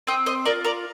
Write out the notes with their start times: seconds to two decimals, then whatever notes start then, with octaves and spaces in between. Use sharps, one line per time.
0.07 C4 D#5 G5
0.26 C5 D#5
0.45 F4 A#4 D5
0.65 A#4 D5